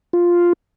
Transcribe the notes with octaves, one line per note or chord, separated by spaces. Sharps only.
F4